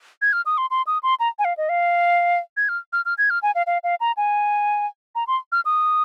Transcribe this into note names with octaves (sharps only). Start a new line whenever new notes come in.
G#6
F6
D#6
C6
C6
D#6
C6
A#5
G#5
F5
D#5
F5
G#6
F6
F6
F6
G#6
F6
G#5
F5
F5
F5
A#5
G#5
A#5
C6
F6
D#6